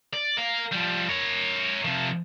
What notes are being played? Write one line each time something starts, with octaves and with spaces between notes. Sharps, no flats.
D5
A#4 F5
F3 G3
A#4 C#5
C3 F3